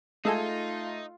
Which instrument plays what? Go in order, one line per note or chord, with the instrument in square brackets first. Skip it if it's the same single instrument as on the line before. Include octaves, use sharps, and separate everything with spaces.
[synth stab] G#3 A4 G#5 [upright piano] A3 [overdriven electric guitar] D#4 [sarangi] F4